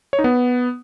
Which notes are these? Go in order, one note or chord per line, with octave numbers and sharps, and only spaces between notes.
C#5
D#4
B3